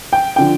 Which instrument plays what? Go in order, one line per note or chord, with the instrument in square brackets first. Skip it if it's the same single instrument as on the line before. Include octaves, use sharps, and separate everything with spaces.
[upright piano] G5
D3 F3 G5